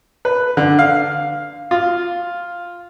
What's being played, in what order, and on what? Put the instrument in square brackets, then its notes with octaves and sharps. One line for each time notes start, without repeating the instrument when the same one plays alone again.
[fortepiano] B4
D3
F5
F4